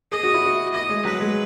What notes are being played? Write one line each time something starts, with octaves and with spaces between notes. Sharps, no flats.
G#4 D#5
F#4
E4
F#4
E4 D#5
G#3
F#3 B4
G#3